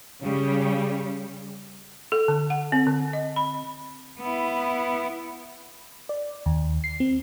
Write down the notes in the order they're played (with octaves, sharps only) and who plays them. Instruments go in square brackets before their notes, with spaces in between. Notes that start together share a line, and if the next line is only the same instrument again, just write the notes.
[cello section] C#3 G3
[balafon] A4
D3
F#5
C4
D3
D#5
B5
[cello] B3 E4
[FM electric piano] D5
D#2
C7
C4